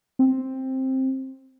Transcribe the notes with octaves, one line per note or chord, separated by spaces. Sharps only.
C4